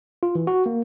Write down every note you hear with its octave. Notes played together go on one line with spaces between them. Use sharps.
F4
E3
F#4
A#3